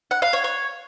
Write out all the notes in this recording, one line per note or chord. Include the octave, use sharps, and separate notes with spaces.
F#5
F5
C#5
C#5